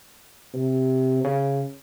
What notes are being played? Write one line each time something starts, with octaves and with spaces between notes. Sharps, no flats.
C3
C#3